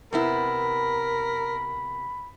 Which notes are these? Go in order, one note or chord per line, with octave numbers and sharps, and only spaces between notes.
C3 B3 E4 A#4 B5